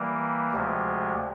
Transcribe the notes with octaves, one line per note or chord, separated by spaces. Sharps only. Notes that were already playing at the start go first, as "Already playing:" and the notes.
Already playing: E3 G3 A#3
D2 C3 F3 G#3